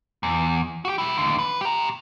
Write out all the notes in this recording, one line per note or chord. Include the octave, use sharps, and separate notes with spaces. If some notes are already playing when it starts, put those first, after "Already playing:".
E2
F#4 G4
E4 G4
D#2 D3
B4
G4 A#5